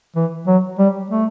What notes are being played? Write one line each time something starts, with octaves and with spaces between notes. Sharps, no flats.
E3
F#3
G3
A3